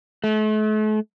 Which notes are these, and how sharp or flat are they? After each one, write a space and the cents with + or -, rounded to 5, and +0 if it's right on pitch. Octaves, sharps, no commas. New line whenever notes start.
A3 -40